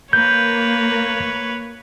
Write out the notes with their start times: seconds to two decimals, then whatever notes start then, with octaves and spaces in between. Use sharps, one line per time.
0.13 A#3 B4 C#5 G6